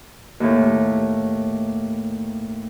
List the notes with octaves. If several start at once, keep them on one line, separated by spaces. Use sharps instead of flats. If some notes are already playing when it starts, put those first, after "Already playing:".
D#2 A2